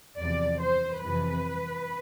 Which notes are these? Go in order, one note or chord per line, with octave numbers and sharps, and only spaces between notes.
E2 C3 F3 D5
C5
F2 C3 E3 B4